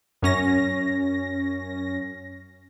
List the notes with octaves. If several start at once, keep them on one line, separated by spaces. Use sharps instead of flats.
F#2 C#4 A#6